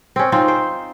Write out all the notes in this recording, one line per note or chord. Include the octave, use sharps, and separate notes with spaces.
C4 C#4
C4 D#4 F4
C5